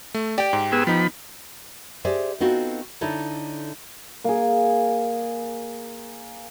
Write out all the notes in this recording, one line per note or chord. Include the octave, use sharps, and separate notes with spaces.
A3
G4 D5 G5
G#2
B3 G#4 E6
F3 B3 D#4 B5
G4 G#4 C5 D5 E5
B3 C4 D#4 F4 F#4 A4
D3 D#4 E4 A4 C#5
A#3 G#4